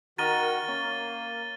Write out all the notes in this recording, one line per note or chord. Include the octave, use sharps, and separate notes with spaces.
D#3 F#4 A#4 D#6 A6 D#7 G7
A#3 C#4